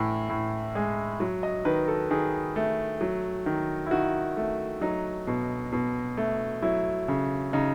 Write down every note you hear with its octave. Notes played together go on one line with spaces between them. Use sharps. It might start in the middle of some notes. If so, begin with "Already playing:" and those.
Already playing: A2 E3
A2
G#3
F#3
D#5
D#3 B4
A4
D#3 G#4
A3
F#3
D#3
E4
D#3 F#4
A3
F#3 D#4
B2
B2
A3
F#3 E4
C#3
C#3 D#4